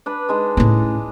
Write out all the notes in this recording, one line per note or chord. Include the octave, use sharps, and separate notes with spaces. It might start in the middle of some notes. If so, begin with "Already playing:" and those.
D4 B4 B5
G#3 D4 D#4
A2 C#4